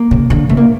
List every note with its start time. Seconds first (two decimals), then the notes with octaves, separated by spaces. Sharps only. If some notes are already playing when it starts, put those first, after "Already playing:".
Already playing: A#3
0.11 C#3
0.30 D3
0.49 C#3 A3
0.57 A#3